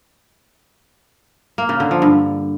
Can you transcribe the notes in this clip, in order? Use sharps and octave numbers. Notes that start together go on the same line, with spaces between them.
A#3
C#3
D3
F3
G2